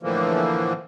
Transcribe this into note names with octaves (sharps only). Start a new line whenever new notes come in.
A2 D3 E3 F3 A#3